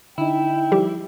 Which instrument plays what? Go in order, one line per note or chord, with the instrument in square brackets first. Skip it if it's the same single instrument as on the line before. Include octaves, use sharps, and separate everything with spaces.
[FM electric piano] D3 D#4 [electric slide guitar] E4 [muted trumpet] G5
[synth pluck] F3 G3 G4